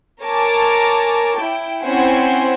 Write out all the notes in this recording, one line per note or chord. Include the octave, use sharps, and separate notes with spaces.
A#4 C#5 G#5 A5 D6
E4 G5
C4 C#4 E4 C5 F#5 G#5